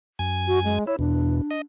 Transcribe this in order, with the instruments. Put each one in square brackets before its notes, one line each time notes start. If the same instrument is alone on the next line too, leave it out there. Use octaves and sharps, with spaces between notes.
[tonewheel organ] F#2 G#5
[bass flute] F#4
G#3
[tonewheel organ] E4 [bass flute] C#5
[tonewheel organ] E2 B2 [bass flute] D4
[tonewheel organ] D#5